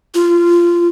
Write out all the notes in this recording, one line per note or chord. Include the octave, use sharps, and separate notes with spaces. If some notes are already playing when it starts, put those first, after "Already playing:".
F4